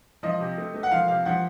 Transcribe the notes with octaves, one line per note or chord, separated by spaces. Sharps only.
F3 D#5
C3
A3
A3
F#5
F3 F5
C3 F5
F3 F#5